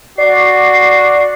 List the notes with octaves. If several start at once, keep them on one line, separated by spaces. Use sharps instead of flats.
F#4 D5 C7